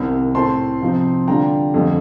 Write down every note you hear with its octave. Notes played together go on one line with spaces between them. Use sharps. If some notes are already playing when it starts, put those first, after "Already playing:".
Already playing: C2 C3 D#3
A2 A3 C4 A5 C6
C3 F3 C4 D#4
D3 G3 D4 F4 G5 A#5
F2 D3 G3